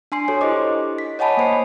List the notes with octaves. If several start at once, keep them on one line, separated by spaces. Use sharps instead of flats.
D4 G#5 C6 C7
D4 F#4 A4 C#5
E4 G4 C5 D#5 D6
B6
C#5 D#5 F#5 G#5 A5 B5
A#3 C5 C7